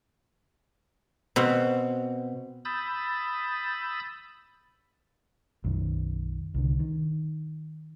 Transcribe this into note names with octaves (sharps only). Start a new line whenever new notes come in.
B2 C4
B5 D#6 E6 G6 A6
B1 F#2 D#3
C2 D3
D#3